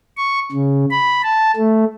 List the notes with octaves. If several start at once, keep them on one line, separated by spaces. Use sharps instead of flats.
C#6
C#3
B5
A5
A3